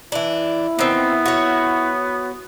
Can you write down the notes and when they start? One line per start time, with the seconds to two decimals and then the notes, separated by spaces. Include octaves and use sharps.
0.12 E3 D4 E4
0.79 D#3 B3 C4
1.26 F#4 C#5